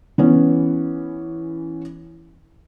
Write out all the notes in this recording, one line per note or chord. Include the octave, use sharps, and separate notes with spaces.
E3 B3 C#4